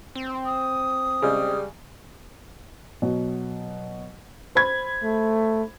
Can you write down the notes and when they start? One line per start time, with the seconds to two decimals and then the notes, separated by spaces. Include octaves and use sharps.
0.15 C4
0.46 D#6
1.22 C#3 G3 G#3
3.02 B2 F#3
4.55 C5 B5 G#6
5.03 A3